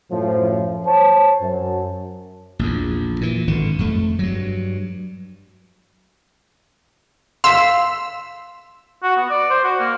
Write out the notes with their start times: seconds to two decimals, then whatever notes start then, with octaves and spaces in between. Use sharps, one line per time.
0.11 F#2 A2 F3
0.86 C5 C#5 A5
1.42 F#2
2.59 A#1 E2
3.21 A#2 E3
3.47 G#1 D3
3.79 F2 A3
4.19 G2 F#3
7.44 F5 C6 E6 B6
9.03 F#4
9.16 B3
9.30 D5
9.50 C5
9.64 F#4
9.79 A#3